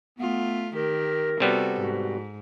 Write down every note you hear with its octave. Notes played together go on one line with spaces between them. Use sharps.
A3 B3 F4
D#3 G4 A#4
C3 G3 B3 F#4 A4
G#2 F#4